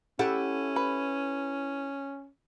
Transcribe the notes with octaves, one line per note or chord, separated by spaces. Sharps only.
C#4 E4 G4 A4 F#5
B4